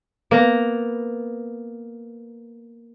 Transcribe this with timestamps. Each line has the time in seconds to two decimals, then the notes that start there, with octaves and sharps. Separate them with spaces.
0.31 A#3 B3 A#5